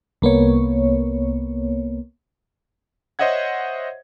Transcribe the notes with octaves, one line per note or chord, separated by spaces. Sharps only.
C2 A#3 B3 C#5
C5 C#5 D#5 E5 F#5 G#6